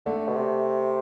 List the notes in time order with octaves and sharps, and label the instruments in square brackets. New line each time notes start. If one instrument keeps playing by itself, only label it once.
[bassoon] D3 [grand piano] A3
[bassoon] B2
C3